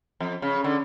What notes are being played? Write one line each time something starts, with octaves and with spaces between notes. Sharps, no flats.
F2
C#3
D3